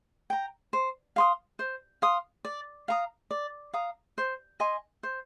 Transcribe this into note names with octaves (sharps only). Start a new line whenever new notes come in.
G5 A#5
C5
F5 C6 D#6
C5
F5 C6 D#6
D5
F5 A#5 D#6
D5
F5 A#5 D#6
C5
D#5 G#5 C6
C5